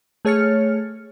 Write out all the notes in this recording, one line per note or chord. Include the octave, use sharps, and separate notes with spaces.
A3 G#4 C#5 F6 A6 C#7